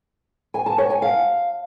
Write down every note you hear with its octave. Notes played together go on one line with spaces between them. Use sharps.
G#5
A5
C#5
G#5
F5